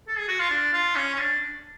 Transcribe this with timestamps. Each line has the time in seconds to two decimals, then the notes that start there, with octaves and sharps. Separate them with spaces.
0.08 A4
0.18 G#4
0.28 F#4
0.39 F4
0.50 D4
0.73 F4
0.96 C#4
1.14 C#4
1.19 D4